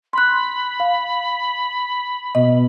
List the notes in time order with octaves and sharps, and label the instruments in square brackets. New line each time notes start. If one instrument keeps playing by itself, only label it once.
[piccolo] B5 [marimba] C6 F#6
[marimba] F5
[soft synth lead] B2 [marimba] D#5